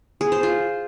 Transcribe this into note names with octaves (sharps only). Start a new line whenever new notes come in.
G#4
C5
F4